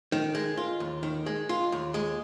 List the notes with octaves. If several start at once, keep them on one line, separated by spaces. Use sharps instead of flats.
D#3
G#3
F4
D#2
D#3
G#3
F4
D#2
G#3